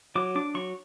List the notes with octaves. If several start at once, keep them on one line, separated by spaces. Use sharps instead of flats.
F#3 D6
D4 D6
F#3 C#6